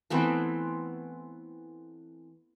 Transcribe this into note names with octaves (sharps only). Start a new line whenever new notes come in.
E3 A3 B3 C4